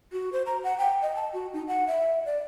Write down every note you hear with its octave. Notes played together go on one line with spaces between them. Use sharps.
F#4
C5
A#5
F#5
G5
D#5
A5
F#4
D#4
F#5
E5
D5